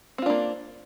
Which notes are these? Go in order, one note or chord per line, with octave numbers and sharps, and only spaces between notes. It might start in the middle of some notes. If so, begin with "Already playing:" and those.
A#3 C4 D4 F4